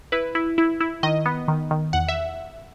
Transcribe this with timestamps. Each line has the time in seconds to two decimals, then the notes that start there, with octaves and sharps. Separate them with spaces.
0.12 E4 B4
0.35 E4
0.58 E4
0.80 E4
1.03 D#3 D#5
1.26 B3
1.48 D#3
1.71 D#3
1.93 E2 F#5
2.08 E5